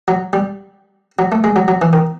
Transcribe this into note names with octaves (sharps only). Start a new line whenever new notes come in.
F#3
G3
F#3
A3
G#3
F#3
F#3
E3
D#3